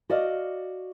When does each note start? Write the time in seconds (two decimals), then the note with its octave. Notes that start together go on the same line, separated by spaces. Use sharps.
0.10 F#4 D5 D#5 F5